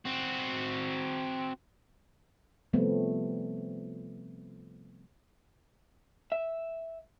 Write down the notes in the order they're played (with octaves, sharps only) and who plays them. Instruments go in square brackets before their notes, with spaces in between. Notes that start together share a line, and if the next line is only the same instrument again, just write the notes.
[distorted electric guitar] C4 F#4
[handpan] C3 F3 G3 A3 B3 C4
[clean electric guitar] E5